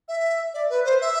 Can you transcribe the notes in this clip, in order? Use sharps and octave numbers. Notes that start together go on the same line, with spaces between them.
E5
D5
B4
C5
E5